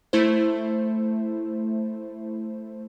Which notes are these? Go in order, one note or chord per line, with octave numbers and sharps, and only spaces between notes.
A3 E4 C5